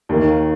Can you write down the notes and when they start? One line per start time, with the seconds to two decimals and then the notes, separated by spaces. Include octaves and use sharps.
0.09 D#2 D#3 A#3